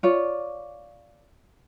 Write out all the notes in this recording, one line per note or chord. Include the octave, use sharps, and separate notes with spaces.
F4 C#5 D5